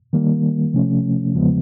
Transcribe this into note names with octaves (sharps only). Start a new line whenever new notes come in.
D#3 G3 A#3
C3 F3 A3 C#4
E2 C#3 F3 G#3 B3